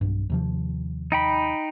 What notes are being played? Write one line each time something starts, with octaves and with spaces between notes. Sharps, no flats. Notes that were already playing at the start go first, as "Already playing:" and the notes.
B1 G2
D#2 C3 F3
D#4 G5 B5